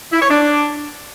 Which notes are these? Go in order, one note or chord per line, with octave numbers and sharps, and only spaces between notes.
E4
C#5
D4